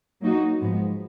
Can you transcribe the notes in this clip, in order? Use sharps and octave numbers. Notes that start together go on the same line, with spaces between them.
F#3 A#3 D#4 F#4
G#2 F3 G#3 B3